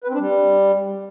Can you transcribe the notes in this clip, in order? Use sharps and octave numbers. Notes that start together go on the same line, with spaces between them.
B4
C4
D4
G3